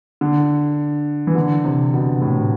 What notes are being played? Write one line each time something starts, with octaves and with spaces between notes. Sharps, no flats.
D3
E3
D3
C3
B2
A2